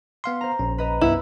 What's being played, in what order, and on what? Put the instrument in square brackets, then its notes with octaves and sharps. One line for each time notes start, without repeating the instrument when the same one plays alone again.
[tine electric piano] B3 F5 C6
[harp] C5 A#5
[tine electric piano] A#1 C#4
[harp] B4 D#5 A#5
[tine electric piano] C2 G2 B3 [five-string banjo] E4 [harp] E6